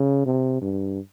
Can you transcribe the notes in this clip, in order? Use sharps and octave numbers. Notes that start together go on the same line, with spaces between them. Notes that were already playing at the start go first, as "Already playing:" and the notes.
Already playing: C#3
C3
G2